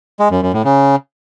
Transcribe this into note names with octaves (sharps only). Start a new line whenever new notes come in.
G#3
F#2
F#2
A2
C#3